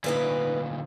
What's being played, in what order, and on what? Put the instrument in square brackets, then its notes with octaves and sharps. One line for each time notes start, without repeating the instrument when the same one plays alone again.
[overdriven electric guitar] D2 A#2 [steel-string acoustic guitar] D#4 B4 D5